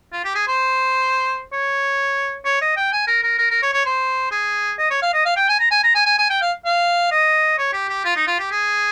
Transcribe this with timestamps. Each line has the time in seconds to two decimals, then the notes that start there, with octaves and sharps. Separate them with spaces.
0.13 F4
0.25 G4
0.35 G#4
0.47 C5
1.53 C#5
2.45 C#5
2.61 D#5
2.77 G5
2.92 G#5
3.07 A#4
3.23 A#4
3.39 A#4
3.51 A#4
3.63 C#5
3.73 C#5
3.86 C5
4.31 G#4
4.79 D#5
4.91 C#5
5.02 F5
5.13 D#5
5.25 F5
5.36 G5
5.49 G#5
5.59 A#5
5.71 G#5
5.84 A#5
5.95 G#5
6.06 G#5
6.19 G#5
6.30 G5
6.42 F5
6.65 F5
7.12 D#5
7.58 C#5
7.73 G4
7.89 G4
8.05 F4
8.16 D#4
8.27 F4
8.39 G4
8.51 G#4